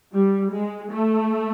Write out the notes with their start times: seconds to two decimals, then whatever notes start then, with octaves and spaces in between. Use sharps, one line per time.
0.13 G3
0.52 G#3
0.91 A3